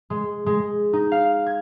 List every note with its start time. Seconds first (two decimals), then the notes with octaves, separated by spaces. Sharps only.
0.10 G#3
0.46 G#3
0.93 D#4
1.12 F5
1.47 G#6